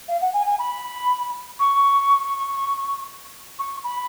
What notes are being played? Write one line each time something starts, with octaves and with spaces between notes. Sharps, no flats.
F5
F#5
G#5
G#5
B5
C#6
C#6
B5